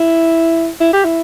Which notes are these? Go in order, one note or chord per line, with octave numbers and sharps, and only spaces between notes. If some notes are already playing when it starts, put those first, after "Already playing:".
Already playing: E4
E4
G4
E4